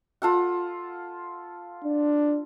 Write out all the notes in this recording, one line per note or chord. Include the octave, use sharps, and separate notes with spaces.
F4 A4 F#5
D4